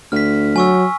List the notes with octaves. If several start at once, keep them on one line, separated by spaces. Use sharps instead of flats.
D2 F6 B6
F#3 G#5 C#6 E6